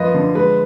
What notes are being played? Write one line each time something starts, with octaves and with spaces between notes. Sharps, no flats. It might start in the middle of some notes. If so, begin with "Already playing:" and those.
Already playing: F#2 F3 B4 D#5
D3
G#3 B4